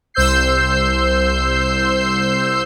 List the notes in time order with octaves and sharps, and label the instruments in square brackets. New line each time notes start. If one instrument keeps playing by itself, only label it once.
[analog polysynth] C2 C5 E6 G6 C7